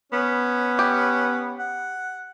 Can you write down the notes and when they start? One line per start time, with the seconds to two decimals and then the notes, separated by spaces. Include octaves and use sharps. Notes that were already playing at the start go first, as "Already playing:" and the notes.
0.12 B3 C#4
0.79 G4
1.59 F#5